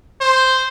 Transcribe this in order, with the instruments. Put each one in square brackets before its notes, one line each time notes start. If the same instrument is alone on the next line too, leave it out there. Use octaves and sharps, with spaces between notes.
[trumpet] C5